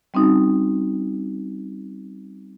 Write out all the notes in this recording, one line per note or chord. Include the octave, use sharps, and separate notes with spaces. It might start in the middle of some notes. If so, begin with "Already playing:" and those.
G3 C4 C#4 D#4 F#4